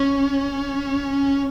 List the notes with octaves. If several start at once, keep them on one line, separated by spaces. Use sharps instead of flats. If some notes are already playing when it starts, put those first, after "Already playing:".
Already playing: C#4